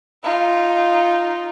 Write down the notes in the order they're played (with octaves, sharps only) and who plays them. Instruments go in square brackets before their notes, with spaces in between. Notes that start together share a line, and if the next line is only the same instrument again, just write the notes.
[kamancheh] D#4 F4